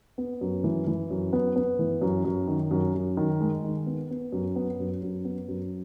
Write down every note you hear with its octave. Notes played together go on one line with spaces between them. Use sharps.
B3
F#2
E3
E3
F#2
B3
B3
E3
F#2
F#2
D#3
F#2
F#2
D#3
G#3
D#3
B3
B3
F#2
B3
F#2
F#2
B3
F#2